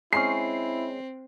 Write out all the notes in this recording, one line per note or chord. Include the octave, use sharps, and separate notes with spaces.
G#3 C4 C#4 E4 C7